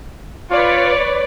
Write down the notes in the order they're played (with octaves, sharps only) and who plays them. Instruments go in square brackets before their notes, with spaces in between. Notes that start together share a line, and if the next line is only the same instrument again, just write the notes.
[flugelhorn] F4 [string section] B4 C#5 D5